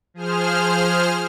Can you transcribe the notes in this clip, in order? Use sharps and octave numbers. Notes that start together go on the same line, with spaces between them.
F3 G#4 C5 F6